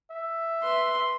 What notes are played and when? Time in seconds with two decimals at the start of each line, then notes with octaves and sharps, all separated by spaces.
0.11 E5
0.63 B4 C6